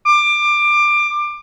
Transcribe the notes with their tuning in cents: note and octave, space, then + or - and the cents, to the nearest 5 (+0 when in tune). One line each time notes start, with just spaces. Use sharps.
D6 +20